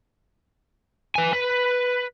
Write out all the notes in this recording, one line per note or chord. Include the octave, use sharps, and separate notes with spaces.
B4 G#5
B4